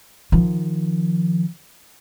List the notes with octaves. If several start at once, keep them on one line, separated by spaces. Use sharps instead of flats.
D#3 F3